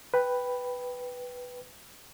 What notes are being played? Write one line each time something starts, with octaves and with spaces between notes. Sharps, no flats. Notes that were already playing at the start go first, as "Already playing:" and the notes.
B4 G5 B5